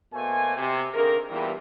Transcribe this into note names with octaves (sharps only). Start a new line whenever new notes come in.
B2 A3 A#3 C5 G#5
C3
D3 D#3 A#3 C4 G#4 A#4
E2 A#2 E3 G3